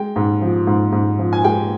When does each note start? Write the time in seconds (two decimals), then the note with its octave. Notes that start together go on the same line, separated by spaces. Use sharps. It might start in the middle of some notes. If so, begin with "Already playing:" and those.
Already playing: G#3 G5
0.16 G#2
0.41 F3
0.67 G#2
0.92 G#2
1.19 F3
1.33 G#5
1.44 G#3 G5